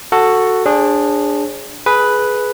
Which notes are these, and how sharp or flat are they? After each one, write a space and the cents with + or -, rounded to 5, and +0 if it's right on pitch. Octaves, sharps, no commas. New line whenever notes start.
F#4 +0 A4 +10
D4 +0 G#4 -15 C5 +45
G#4 +15 B4 +0